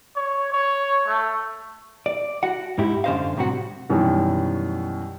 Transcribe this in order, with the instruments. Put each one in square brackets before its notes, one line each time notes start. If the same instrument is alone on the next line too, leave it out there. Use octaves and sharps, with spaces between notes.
[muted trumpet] C#5
C#5
A3
[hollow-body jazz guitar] D5
F#4 F#5
G#2 D#4 E4 G4
F#2 D3 C#4 C5 D#5 F5
A2 C3 F#3 G3 C4 F#4
[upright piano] F#2 B2 D#3 E3 G3